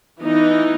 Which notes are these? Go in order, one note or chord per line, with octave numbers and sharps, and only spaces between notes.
E3 B3 D#4